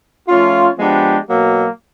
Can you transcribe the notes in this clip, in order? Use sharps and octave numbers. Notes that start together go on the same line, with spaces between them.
F3 A3 C#4 F4
F3 G#3 B3 D4 G4
B2 F#3 A#3